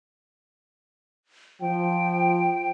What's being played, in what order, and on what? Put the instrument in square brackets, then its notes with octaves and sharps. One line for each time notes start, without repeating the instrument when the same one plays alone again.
[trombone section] F3 [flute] G5